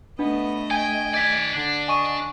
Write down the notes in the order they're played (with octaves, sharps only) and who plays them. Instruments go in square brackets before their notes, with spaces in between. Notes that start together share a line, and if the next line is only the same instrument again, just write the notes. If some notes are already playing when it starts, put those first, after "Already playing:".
[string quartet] A3 D#5 [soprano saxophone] B3 [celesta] D4
[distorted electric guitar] G5 [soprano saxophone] G#5
[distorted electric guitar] D#3 D5 [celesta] G#6 B6
[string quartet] D3 [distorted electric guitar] D4
[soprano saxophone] D#5 [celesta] G#5 C#6 D#7